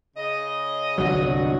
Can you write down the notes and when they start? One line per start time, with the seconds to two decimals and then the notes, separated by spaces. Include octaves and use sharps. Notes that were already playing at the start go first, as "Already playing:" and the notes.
0.16 C#3 D#5
0.98 G1 C2 F#3 D4 F#4